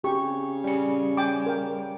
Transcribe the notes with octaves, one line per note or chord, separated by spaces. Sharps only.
C#3 G4 C#6
G3 C#4 C#7
G5 G#5 D6
A#4 G5